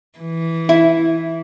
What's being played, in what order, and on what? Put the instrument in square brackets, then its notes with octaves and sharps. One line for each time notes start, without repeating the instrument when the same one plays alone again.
[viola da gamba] E3
[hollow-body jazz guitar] E4